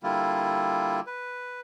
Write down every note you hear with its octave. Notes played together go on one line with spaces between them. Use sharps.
D3 G3 A#3 E4 F4
B4